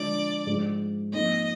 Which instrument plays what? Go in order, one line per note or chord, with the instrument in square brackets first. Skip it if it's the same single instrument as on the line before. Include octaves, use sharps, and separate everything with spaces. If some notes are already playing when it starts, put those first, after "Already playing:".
Already playing: [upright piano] D3 F3 G#3 D4 F4 [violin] D5
[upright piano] G#2 F3 G#3
[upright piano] F2 F3 A#3 D#4 [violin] D#5